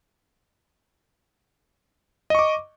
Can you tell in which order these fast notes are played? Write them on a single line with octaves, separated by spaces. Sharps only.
D#5 C#6 D6